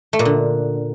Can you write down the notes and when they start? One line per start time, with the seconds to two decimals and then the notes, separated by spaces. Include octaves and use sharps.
0.13 A3
0.19 A#2
0.25 D3